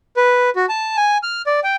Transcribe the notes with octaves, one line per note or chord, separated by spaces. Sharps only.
B4
F#4
A5
G#5
F6
D5
G5